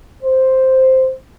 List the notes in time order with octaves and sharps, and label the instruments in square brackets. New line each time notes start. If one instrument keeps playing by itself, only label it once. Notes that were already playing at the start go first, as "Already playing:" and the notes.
[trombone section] C5